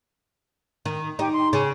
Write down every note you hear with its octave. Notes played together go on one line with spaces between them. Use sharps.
D#3
D#4 G4
C6
C#3 G#5